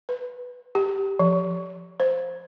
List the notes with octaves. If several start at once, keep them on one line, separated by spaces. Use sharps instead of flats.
B4
G4
F3
C5